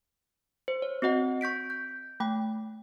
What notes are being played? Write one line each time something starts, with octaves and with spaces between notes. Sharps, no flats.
C5
C#5
C4 F#4 D#5 F#5
C#6 G6 B6 D7
G6
A3 G5